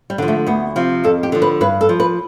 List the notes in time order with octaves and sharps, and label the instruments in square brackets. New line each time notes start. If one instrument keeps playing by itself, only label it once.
[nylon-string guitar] G3
D3 F3
A3
D2 B3
C3 F3
F2 A4
G4
D3 F3
B4
G2 B4
A4
F3
B4